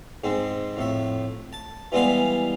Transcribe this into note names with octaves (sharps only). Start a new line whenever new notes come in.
G#2 G#3 C4
F2 A2 E5
A5
E3 G3 G#3 B3 F5 B5